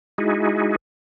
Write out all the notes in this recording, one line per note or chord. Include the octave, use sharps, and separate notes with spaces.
G#3 D#4 E4 F#4 G#4